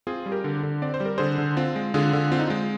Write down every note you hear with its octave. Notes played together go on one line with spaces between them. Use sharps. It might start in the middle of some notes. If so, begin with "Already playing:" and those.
C4 F4 G#4
G3
G4 A#4
D3
D3
C4 D5
C5
G3
A#4
D3 G#4 C5
D3
C4 F4
G#3
D3 F4 G#4
D3
C4 F4
D#4
G#3 F4